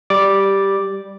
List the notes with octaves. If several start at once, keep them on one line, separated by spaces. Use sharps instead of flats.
G3 D5 D6